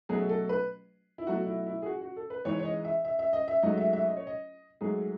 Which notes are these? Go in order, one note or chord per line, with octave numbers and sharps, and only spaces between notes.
B2 F#3 A3 G#4
A4
B4
E4
B2 F#3 A3 F#4
E4
E4
G#4
F#4
F#4
A4
B4
G#2 E3 G#3 C#5
C#5
D#5
E5
E5
E5
D#5
E5
G#2 F#3 A3 D#5
E5
E5
D#5
C#5
D#5
G#2 F#3 A3 G#4